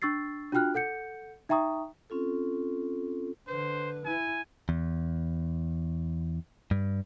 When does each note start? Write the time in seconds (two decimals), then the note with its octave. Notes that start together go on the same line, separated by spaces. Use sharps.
0.02 D4 C#6 E6 A6 C7
0.52 D4 F4 F#4 G5 F6 F#6
0.74 A4 F#5 G6 C#7
1.49 D#4 E5 G5 A#5 C#6 D#6
2.10 C4 C#4 F4 A4
3.48 D3 B4 C5
4.05 E4 G#5
4.69 E2
6.71 G2